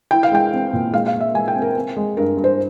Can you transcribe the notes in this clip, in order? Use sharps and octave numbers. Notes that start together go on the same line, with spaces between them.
E4 G5
F5
G#3 G5
C4
A#2
G#3 F5
F5
G#3
E5
G#3 G#5
G5
C4
A#4
C4
G#3
G2 A#4
G2
C5